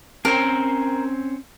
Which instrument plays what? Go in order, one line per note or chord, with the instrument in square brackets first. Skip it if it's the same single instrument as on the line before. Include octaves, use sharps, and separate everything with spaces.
[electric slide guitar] C4 C#4 C5 [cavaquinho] A#4